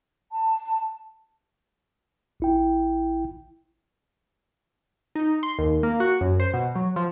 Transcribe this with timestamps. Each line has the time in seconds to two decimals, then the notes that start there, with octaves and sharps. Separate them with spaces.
0.32 A5
2.40 A1 E4 G5
5.15 D#4
5.43 C6
5.59 D#2
5.83 A#3
6.00 F#4
6.21 F#2
6.40 C5
6.54 B2
6.75 F#3
6.96 F3